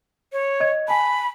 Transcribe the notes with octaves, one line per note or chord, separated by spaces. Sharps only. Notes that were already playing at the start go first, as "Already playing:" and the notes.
C#5
D#5 G#6
G#5 A5 B5